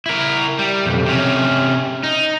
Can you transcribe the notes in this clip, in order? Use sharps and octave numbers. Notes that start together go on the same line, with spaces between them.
E4 A#4
G3
B1 F2
C3 C#4
D#4